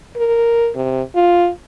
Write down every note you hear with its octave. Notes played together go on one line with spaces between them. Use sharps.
A#4
C3
F4